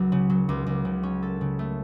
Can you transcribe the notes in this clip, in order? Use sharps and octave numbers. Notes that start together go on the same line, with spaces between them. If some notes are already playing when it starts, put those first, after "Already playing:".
Already playing: C#2 F#3
C#3
F#3
C#2
C#2
C#3
C#4
A4
C#3
A3